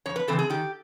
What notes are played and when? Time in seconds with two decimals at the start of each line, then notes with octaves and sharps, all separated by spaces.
0.06 F2 C#5
0.16 B4
0.28 C#3 E3 C4 A4
0.39 G#4
0.50 D#3 G4